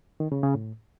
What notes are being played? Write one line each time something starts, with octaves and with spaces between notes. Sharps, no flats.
D#3
C#3
C#3
A2